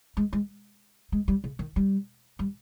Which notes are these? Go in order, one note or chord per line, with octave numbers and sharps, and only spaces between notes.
G#3
G#3
G#3
G3
C#3
D#3
G3
G3